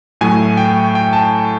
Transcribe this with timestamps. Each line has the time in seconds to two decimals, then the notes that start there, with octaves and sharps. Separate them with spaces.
0.21 A2 F#3 A3 G#5
0.57 G5
0.95 G5
1.13 A5